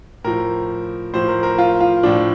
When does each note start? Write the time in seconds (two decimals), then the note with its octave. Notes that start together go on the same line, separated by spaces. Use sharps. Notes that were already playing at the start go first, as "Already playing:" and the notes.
0.24 A2 F3 A#4
1.14 A2 F3 C5
1.28 A#4
1.43 A#4
1.58 F4
1.80 F4
2.03 A2 F3 D4